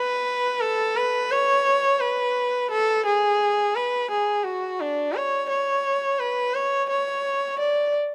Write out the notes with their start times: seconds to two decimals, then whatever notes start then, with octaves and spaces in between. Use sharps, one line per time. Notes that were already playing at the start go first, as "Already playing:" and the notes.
Already playing: B4
0.61 A4
0.96 B4
1.31 C#5
2.00 B4
2.71 A4
3.06 G#4
3.75 B4
4.11 G#4
4.44 F#4
4.80 D4
5.14 C#5
5.50 C#5
6.19 B4
6.54 C#5
6.89 C#5
7.59 D5